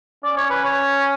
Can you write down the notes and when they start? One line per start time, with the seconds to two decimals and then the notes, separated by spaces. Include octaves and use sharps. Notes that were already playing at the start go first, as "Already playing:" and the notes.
0.24 C#4 D5
0.37 C#5
0.50 B4
0.64 C#5